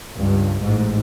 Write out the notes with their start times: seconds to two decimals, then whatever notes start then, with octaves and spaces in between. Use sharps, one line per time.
0.17 C#2 G2
0.62 A1 G#2